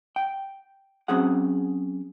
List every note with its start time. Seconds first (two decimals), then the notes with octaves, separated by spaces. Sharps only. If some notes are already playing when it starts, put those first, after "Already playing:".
0.16 G5
1.08 F#3 C4 C#4 G#4 F#5